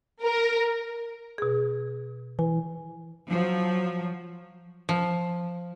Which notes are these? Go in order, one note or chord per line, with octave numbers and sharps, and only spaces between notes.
A#4
B2 G#4
E3 G#5
F3 F#3
F3